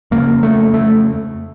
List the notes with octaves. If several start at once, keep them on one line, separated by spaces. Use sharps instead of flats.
F2 C#3 A#3
A3
A3